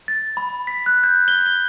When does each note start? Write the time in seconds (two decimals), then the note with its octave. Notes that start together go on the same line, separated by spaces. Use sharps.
0.08 A6
0.37 B5
0.67 B6
0.86 F#6
1.04 G6
1.28 G7
1.46 G7